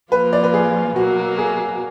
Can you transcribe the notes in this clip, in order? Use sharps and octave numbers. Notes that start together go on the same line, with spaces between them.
F3 A#3 F4 B4
D5
B4
G#4
B2 F#3 A#3 F#4
G#4